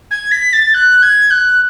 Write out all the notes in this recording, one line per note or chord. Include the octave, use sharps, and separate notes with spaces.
G#6
B6
A6
F#6
G#6
F#6